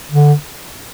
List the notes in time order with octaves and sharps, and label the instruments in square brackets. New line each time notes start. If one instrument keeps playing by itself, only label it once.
[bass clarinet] D3